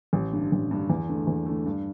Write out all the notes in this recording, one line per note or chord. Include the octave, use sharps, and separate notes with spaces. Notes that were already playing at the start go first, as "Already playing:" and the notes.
A1
G2 D3
A1
G2 D3
E2
D3 A3
E2
D3 A3
G2